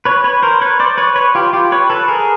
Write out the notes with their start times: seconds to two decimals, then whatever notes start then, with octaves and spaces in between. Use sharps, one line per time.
0.05 B4 C#5
0.24 B4 C#5
0.43 A#4 C5
0.61 B4 C#5
0.79 C5 D5
0.98 B4 C#5
1.16 B4 C#5
1.35 F4 G4
1.53 F4 G4
1.72 B4 C#5
1.90 A4 B4
2.08 G#4 A#4